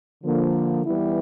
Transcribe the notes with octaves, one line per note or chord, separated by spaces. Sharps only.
D3 F3 A#3
E3 G3 B3 E4